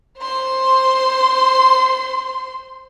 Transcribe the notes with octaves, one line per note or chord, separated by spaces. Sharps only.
C5 C6